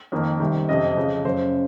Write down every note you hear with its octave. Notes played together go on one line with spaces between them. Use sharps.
F2 D#3 A#3
C2 C3 D#3
F#1 F2 C3 D#5
F2 C#3 F3
F#1 F#2 C#3 C5